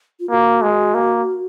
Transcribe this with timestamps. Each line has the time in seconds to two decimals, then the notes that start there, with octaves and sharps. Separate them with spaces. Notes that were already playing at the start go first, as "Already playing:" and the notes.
0.20 F4
0.30 A#3 F#4
0.62 G#3
0.94 A#3